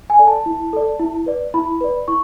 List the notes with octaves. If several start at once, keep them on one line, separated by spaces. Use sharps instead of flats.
G#5
A4 D5
A5
E4
A4 D5
E4
B4 D5
E4 B5
B4 D5
E4 C#6